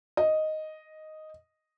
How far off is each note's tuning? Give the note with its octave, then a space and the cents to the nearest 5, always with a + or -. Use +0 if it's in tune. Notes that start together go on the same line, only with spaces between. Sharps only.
D#5 +0